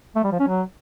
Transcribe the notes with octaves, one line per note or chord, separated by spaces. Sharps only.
A3
G3
F3
C#4
F#3